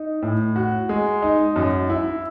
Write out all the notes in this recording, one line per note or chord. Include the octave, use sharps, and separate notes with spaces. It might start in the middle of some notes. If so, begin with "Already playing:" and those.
Already playing: D#4
A2
F#4
G#3
D#4
F#2
E4